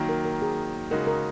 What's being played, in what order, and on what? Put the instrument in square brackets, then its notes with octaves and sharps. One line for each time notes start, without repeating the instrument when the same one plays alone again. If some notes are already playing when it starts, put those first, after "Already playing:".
Already playing: [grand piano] D#3 F#3 A#3
[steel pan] A#4
A#4
G#4
[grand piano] C#3 G#3 D#4 F#4 [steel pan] A#4
[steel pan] A#4